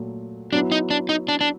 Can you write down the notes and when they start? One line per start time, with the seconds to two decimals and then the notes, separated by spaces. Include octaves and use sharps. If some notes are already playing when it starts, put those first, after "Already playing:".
Already playing: A#2 F#3 A3
0.52 F#3 B3 D4 E4
0.72 D#4
0.90 D4
1.09 D#4
1.28 D4
1.41 D4